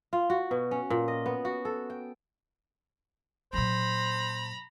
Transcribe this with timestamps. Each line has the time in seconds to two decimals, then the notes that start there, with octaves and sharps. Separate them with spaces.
0.13 F4
0.30 F#4
0.51 B2
0.71 C#4
0.90 A#2
1.08 D#5
1.26 B3
1.45 F#4
1.65 A4
1.90 G5
3.53 A#2 F#3 C5 A#5 B5